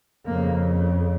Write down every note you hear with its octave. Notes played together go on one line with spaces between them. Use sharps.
F2 C#3 A#3